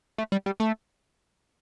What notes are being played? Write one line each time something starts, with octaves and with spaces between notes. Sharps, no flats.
A3
G3
G3
A3